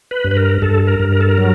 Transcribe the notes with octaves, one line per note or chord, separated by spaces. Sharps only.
B4
G2
B4
A#4
G2 A4
A#4
G2
A#4
A4
A#4
F#3